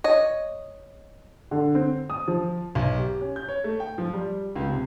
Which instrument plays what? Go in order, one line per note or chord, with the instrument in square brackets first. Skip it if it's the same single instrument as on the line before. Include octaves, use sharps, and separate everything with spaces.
[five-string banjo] C#5 D#5
[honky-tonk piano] D3
C4
D#6
F3
[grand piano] B1
G4
C#4
G6
C#5
A3
G5
F3
G3
C#2
C3